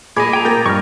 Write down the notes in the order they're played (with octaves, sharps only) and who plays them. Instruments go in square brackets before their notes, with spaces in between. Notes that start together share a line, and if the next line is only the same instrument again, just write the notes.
[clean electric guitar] A#2 C#5 D#5 [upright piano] G#4 [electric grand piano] B5 D6 G#6
[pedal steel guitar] G5 A#5
[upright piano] A#3 [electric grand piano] G6 A6 A#6
[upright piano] G2 [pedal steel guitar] C#6 F6